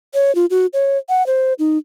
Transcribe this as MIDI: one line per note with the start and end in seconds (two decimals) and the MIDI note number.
0.14 0.34 73
0.35 0.46 65
0.50 0.66 66
0.73 0.98 73
1.09 1.25 78
1.27 1.53 72
1.59 1.78 63